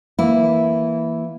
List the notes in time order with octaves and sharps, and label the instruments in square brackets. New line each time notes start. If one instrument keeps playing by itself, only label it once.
[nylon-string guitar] E3 A#3 E4